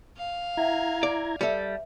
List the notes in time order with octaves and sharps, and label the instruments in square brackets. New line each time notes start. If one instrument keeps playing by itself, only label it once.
[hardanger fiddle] F5
[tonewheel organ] E4 A#5 G#6 [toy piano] E5 F#5 A5
[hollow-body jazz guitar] D5
[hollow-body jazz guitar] G3 A4 [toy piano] B4 E5